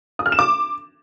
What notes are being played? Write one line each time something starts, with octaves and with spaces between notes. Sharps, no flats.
D#6
F6
E7
D6